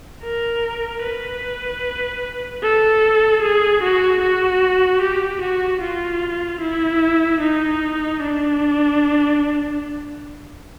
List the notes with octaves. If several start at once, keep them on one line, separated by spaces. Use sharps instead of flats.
A#4
B4
A4
G#4
F#4
F#4
G4
F#4
F4
E4
D#4
D4